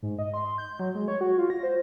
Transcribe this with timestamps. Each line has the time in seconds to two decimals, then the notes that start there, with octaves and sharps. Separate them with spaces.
0.02 G#2
0.19 D#5
0.34 C6
0.58 G6
0.79 F#3
0.95 G#3
1.08 C#5
1.21 F#4
1.38 F4
1.50 A#6
1.63 C5